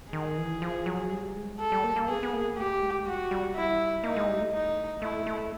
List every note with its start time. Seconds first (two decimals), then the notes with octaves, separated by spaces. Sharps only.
0.13 D#3 G#4
0.38 E3
0.62 F3
0.86 F#3
1.11 G3
1.36 G#3
1.60 A4
1.72 G3
1.84 A#3
1.96 A#3
2.08 B3 G#4
2.23 B3
2.33 A#3
2.57 A3 G4
2.82 G#3
3.06 G3 F#4
3.31 G3
3.56 E4
4.04 A#3 D#4
4.16 G#3
4.28 G3
4.41 A3
4.53 D#4
5.02 A3 E4
5.27 A3